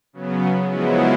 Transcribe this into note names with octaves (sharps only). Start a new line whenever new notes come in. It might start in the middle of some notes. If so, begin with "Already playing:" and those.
C#3 F#3 B3
C#3 F3 F#3 G#3 B3 E4